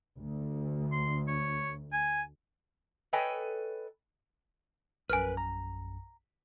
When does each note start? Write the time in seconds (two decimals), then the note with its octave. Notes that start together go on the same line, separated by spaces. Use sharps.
0.18 D2
0.92 C6
1.28 C#5
1.93 G#5
3.13 A4 B4 C#5 D#5 G5 G#5
5.10 A#1 F#2 A#4 B4 G#5 F6
5.37 A#5